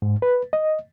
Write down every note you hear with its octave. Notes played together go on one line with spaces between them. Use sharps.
G#2
B4
D#5